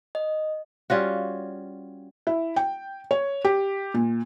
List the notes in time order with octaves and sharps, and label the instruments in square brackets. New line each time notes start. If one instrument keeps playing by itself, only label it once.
[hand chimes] D#5
[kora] G3 C#4 F4 F#4
[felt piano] E4
G5
C#5
G4
A#2